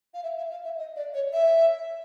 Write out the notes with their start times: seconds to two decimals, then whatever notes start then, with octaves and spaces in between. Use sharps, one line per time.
0.14 F5
0.23 E5
0.37 E5
0.51 F5
0.64 E5
0.78 D#5
0.96 D5
1.14 C#5
1.33 E5